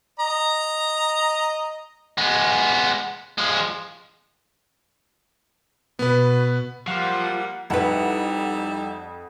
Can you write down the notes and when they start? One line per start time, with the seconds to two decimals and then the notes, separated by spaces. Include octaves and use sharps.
0.20 D#5 A#5
2.18 G#3 B3
3.38 F3 G#3
5.99 B2 B3 B4
6.88 F3 G3 A#3 F#5
7.70 F2 G3 D#4 E4 B4 E5 F#5